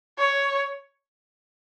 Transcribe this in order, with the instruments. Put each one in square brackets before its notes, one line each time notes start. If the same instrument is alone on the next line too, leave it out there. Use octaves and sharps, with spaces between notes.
[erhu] C#5